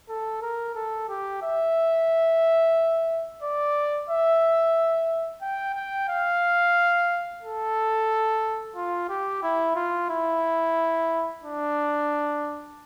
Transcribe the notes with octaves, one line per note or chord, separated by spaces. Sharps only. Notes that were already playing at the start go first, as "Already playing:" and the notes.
A4
A#4
A4
G4
E5
D5
E5
G5
G5
F5
A4
F4
G4
E4
F4
E4
D4